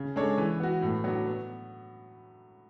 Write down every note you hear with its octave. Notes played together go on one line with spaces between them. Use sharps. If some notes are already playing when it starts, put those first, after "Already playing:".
Already playing: C#3
G#3 D4 A4 C#5
E3
B3 F#4
A2
F#3 B3 D4
B3